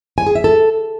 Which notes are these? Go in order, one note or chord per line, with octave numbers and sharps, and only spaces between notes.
G#5
G#4
E5
A4